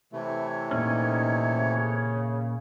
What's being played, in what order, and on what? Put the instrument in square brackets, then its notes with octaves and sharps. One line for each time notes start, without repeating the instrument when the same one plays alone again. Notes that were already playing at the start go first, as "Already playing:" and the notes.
[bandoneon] C3 E3 A3 [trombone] E4 [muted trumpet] C#5
[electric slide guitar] A#2 C#4 [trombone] D#4
[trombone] C#3